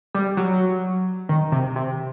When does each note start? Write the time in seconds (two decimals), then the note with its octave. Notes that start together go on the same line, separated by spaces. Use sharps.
0.15 G3
0.37 F#3
1.29 D#3
1.52 C3
1.76 C3